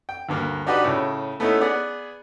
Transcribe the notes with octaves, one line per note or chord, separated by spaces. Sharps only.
G5
D2 G2 A#3 A#4
D4 D#4 F#4 G4 B4 D5
A2 C#3
A3 B3 C#4 D#4 E4
B3 G#4 D5 F#5